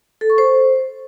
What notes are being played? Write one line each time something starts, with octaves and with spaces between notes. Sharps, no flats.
A4
C#6
C5